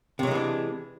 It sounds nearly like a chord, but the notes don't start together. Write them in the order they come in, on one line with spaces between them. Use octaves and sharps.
C3 F#3 G#3 E3 D4